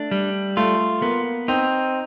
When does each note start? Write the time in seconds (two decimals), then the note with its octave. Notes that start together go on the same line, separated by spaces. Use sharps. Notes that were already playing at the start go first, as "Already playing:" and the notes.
Already playing: A3 D4
0.11 G3
0.57 A3 F4
1.02 A#3 B3
1.48 C4 D#4